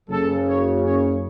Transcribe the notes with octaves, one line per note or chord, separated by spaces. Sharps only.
F#1 F#2 C#3 A4
C#5
C#5